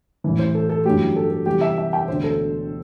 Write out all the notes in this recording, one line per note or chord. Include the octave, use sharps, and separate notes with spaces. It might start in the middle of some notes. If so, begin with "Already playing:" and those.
A1 A2 E3
C5
A4
A4
A1 G2 D3 F#3 A3 G4
A4
A4
E2 C3 G3 G4
E5
E5
G5
E1 D2 D3 C5
A4